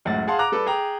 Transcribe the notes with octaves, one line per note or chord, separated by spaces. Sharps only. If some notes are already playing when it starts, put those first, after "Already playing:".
C#2 F#2 A2 F#5 A6
G#4 F5 F#5 A5 C6
A#5 D6 F#6
G3 A4 B4
G#4 G5 A#5 D#6